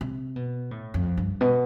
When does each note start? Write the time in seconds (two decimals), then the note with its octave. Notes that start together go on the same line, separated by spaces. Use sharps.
0.01 C3
0.36 B2
0.71 A2
0.94 F2
1.17 G2
1.41 B2